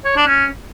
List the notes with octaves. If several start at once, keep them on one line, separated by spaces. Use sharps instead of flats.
C#5
D4
C#4